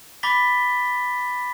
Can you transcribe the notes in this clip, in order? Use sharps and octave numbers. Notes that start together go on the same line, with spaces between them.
B5 D6 A6 B6 G7